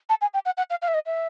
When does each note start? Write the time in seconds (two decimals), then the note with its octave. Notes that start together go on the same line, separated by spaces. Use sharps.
0.09 A5
0.21 G#5
0.34 G5
0.46 F#5
0.57 F#5
0.70 F5
0.82 F5
0.88 E5
0.94 D#5
1.06 E5